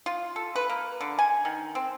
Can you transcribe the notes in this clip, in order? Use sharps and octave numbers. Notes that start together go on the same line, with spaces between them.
F4
A4
B4
A#3
D3
G#5
D#3
C4